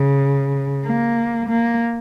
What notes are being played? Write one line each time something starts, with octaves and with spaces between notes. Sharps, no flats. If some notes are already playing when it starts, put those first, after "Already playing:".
Already playing: C#3
A#3
A#3